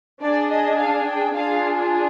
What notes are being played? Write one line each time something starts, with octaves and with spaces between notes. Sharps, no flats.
D4 G#4 D5
D#5
F5
G5
D4 F4 G#4 F5